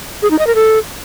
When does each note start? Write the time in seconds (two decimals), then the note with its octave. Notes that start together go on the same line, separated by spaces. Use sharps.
0.22 G#4
0.31 D#4
0.39 D#5
0.47 A#4
0.55 A4